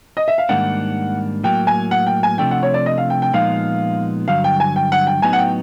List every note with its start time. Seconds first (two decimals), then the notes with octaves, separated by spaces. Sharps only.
0.17 D#5
0.28 E5
0.38 F5
0.49 G#2 D#3 G3 A#3 D4 F#5
1.44 A2 F#3 A#3 G5
1.67 G#5
1.91 F#5
2.07 G5
2.23 G#5
2.38 C3 F3 A3 D4 G5
2.51 F#5
2.63 C#5
2.74 D5
2.86 D#5
2.98 F5
3.10 G5
3.22 G5
3.33 A#2 F3 G#3 B3 D#4 F5
4.28 G2 D3 F#3 F5
4.44 G5
4.60 G#5
4.76 G5
4.92 F#5
5.07 G5
5.22 A2 F#3 B3 D#4 G#5
5.33 F#5
5.38 G5